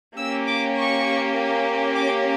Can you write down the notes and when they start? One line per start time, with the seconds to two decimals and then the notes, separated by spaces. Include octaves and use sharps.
0.17 A#3 C#4 G4 E6
0.47 D6
0.76 C#6
1.95 D6